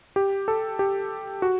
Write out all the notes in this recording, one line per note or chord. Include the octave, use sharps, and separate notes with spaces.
G4
A4
G4
F#4